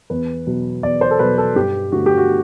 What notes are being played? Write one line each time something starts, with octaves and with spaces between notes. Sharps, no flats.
E2 B4
B2 F#3
E2 D5
C5
A4
B2 F#3 B4
A4
G2 G4
D3 A3 F#4
G4
F#4